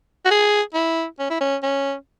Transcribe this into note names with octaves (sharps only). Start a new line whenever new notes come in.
F#4
G#4
E4
C#4
E4
C#4
C#4